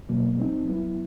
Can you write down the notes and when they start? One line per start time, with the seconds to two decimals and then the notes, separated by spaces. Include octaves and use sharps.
0.09 B2 F#3 A#3
0.37 G3 C4 D#4
0.65 F#3 B3 E4